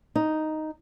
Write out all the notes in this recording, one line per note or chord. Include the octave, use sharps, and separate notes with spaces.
D#4